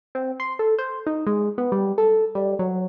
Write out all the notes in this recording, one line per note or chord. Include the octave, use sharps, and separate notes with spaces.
C4
C6
A4
C5
D#4
G#3
B3
G3
A4
G3
F#3